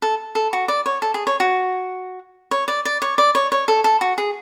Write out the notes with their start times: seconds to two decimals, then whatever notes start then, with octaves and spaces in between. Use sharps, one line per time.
0.02 A4
0.35 A4
0.53 F#4
0.68 D5
0.86 C#5
1.02 A4
1.14 G#4
1.27 C#5
1.40 F#4
2.51 C#5
2.68 D5
2.85 D5
3.02 C#5
3.18 D5
3.35 C#5
3.52 C#5
3.68 A4
3.84 A4
4.01 F#4
4.18 G#4